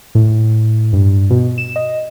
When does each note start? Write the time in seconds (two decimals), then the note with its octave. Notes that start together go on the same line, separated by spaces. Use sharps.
0.15 A2
0.93 G2
1.30 B2
1.58 E7
1.76 D#5